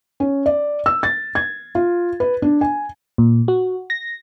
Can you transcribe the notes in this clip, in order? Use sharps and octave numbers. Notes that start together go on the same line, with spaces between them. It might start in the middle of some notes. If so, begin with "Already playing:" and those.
C#4
D5
E6
A6
G#6
F4
B4
D4
G#5
A#2
F#4
A#6